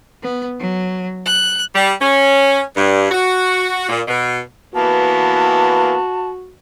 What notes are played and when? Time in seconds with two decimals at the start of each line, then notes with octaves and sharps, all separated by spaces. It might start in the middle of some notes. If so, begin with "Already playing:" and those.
0.23 B3
0.59 F#3
1.26 F#6
1.75 G3
2.01 C#4
2.76 G2
3.11 F#4
3.89 A#2
4.08 B2
4.75 E3 A#3 B3 F#4 A5